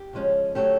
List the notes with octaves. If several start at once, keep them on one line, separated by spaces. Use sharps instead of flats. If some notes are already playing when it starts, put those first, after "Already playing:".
Already playing: G4
C#3 F3 G#3 C#4
D3 F#3 A3 C#4 G4 A4